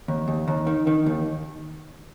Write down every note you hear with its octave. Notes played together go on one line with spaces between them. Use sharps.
D#2
D#2
D#2
D#3
D#3
D#2